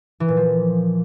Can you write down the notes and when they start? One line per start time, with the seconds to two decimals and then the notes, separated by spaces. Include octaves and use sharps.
0.20 E3
0.28 A#2
0.37 F3